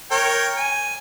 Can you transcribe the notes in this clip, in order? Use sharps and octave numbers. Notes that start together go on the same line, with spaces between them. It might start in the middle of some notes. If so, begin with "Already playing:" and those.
A#4 C#5 G5
G#5